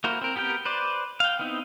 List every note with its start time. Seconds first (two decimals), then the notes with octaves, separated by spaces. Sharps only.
0.04 A#3 E4 F#4 A#4 C5
0.22 C4 A#4
0.36 B3 G4 A#4 G5
0.65 B4 C5 D5
1.20 F5 G5
1.39 B3 C4 D#4 E4